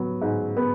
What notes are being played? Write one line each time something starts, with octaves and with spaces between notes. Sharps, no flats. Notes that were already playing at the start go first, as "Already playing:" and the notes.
Already playing: F#3 B3
G#2
B3